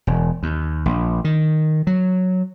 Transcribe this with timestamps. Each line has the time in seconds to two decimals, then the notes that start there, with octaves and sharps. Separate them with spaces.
0.07 E1
0.43 D#2
0.86 A#1
1.24 D#3
1.87 F#3